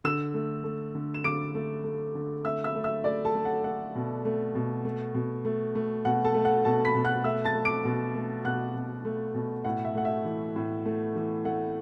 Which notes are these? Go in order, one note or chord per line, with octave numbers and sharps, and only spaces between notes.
D3 E6 E7
A3
A3
D3
E7
D3 D6 D7
A3
A3
D3
A3 E5 E6
E5 E6
A3
E5 E6
A3 D5 D6
A4 A5
A3
F#5
A3 F#5
B2
A3
B2
A3
B2
A3
A3
B2 F#5
A4 A5
A3
F#5
B2 A4 A5
B5 B6
B2
F#5 F#6
A3 E5 E6
A5 A6
A3
D6 D7
B2
A3
B2 F#5 F#6
B2
A3
B2
A2 F#5
E5
A3 F#5
E5
E3
A2
A3
E3
A3 F#5